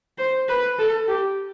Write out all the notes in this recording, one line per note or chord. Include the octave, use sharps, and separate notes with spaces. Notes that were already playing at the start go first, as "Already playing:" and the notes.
C5
B4
A4
G4